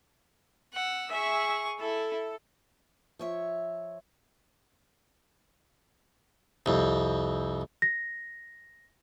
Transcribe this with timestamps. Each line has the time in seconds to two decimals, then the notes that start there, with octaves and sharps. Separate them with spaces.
0.74 F#5 E6
1.12 G#4 E5 C#6
1.80 E4 A4
3.19 F3 C#5 E5
6.66 C2 F2
7.82 A#6